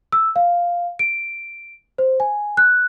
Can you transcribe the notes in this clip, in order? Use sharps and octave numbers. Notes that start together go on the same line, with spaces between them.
E6
F5
D7
C5
G#5
F#6